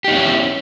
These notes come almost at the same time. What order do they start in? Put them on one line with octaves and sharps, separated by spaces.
G4 D#4 B3 C#4 E4